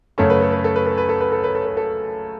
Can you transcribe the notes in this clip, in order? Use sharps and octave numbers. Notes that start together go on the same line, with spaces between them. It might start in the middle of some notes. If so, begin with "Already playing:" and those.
F#2 C#3 A3 C#4 A4
B4
A4
B4
A4
B4
A4
B4
A4
B4
A4
B4
A4
B4
A4